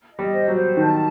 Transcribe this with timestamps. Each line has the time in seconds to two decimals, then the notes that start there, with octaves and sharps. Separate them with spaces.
0.11 D#5
0.19 G3
0.33 C5
0.48 F#3
0.55 C5
0.76 D#3 A5